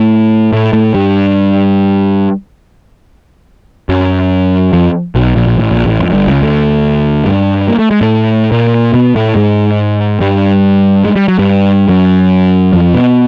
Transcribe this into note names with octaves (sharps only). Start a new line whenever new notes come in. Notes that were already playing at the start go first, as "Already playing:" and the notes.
Already playing: A2 A3
A2 A3
A2 A3
G2 G3
F#2 F#3
F2 F3
B1 B2
A#1 A#2
A#2
A1 A2
A#1 A#2
A1 A2
F2
F#2
G1 G2
C#2 C#3
D2 D3
G2 G3
A#3
A3
G#3
A2 A3
A#2 A#3
B2 B3
A2 A3
G#2 G#3
G2 G3
G#3
G3
F#3
G2 G3
F#2 F#3
F2 F3
B2 B3